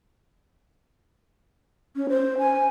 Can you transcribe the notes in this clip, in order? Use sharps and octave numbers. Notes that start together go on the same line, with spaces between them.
C#4
C5
G#5